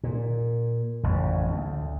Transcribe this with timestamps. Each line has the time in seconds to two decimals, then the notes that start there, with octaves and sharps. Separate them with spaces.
0.04 A#2
1.04 A1 F2 C#3
1.46 D2